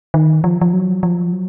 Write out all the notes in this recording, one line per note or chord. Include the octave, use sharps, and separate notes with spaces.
D#3
F3
F3
F#3
F3
F#3